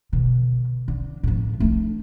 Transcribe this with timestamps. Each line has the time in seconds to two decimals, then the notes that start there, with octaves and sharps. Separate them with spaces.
0.13 B2 D3
0.88 D3
1.23 A2 F3
1.60 A3 D4